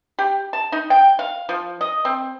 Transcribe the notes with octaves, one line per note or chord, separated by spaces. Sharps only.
G4
A5
D#4
G5
F5
F3
D#5
C4